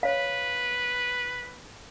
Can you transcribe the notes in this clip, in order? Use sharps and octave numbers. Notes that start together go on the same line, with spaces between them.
B4 C#5 F5